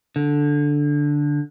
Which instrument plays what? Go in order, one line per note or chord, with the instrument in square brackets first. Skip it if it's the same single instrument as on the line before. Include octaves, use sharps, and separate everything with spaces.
[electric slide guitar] D3